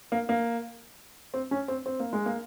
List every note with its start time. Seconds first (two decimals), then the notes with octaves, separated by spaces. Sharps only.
0.12 A#3
0.29 A#3
1.34 C4
1.51 C#4
1.68 C4
1.86 C4
2.00 A#3
2.13 G#3
2.26 A#3